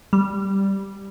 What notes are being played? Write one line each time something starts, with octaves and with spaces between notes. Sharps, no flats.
G3